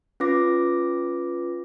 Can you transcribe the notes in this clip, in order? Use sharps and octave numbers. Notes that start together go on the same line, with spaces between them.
C#4 F4 B4 D6 A#6